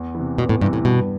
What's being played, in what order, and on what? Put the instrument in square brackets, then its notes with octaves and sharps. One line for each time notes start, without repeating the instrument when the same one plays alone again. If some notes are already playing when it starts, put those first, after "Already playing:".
Already playing: [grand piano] E2
C3 E3
[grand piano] E2 [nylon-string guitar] B2
[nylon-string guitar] A2
[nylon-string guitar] G2 [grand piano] C3 E3
[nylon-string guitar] A2
[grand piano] G2 [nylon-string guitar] B2